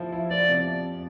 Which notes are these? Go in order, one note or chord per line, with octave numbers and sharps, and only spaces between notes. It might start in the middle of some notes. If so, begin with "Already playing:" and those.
Already playing: F3 E4
E4
F3 D5
C3
F2